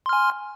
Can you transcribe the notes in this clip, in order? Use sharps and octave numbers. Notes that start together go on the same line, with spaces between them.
G#5 C6 F6